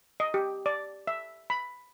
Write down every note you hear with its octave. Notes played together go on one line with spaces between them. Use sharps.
D#5
G4
D5
E5
B5